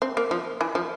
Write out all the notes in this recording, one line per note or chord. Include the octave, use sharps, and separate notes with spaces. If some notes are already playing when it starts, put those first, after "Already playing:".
C4
A#3
F3
E3
F3